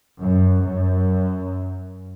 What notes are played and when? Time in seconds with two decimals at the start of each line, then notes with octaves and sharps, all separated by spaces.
0.21 F#2
0.65 F#2